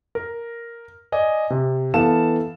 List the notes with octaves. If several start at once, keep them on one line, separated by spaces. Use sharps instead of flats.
A#4
D5 D#5 G#5
C3
E3 B3 A4 F5 A5 E7